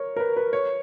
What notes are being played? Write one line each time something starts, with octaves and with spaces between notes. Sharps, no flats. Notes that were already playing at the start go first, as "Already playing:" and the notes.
Already playing: A#4 C#5
A#4
B4
B4
C#5